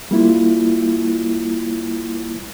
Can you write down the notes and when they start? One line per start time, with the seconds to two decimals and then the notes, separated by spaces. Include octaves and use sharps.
0.11 G3 A#3 E4 F4